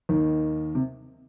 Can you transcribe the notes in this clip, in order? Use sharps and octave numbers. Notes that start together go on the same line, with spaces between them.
D#2 D#3
C3